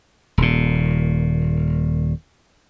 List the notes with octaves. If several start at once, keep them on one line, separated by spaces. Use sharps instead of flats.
D#1 A#2